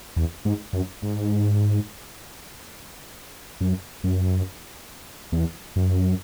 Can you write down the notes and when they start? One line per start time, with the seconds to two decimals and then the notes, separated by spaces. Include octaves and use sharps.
0.16 E2
0.45 G#2
0.73 F#2
1.02 G#2
3.61 F#2
4.04 F#2
5.32 E2
5.76 F#2